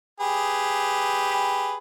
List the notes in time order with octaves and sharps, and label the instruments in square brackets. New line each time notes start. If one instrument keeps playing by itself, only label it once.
[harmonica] G4 G#4 B4